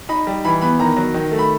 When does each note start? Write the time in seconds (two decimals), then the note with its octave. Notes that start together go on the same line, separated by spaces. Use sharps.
0.09 D#4 B5
0.27 G3
0.45 E3 B5
0.61 B3 B5
0.79 D#3 A#5
0.96 F#3
1.14 D#3
1.31 A3
1.39 B5